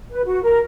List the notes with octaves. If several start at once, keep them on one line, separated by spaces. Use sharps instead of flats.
B4
F#4
A#4